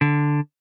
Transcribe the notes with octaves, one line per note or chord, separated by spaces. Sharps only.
D3